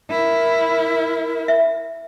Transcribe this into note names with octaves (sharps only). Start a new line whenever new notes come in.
E4 A#4
E5